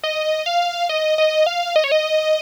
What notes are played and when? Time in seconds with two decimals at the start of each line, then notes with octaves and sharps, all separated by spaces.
0.03 D#5
0.46 F5
0.89 D#5
1.18 D#5
1.46 F5
1.76 D#5
1.84 C#5
1.92 D#5